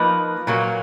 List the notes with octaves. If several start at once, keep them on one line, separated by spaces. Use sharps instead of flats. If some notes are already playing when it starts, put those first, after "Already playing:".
Already playing: F3 A#3 D#4 B4
A#2 F#3 A#3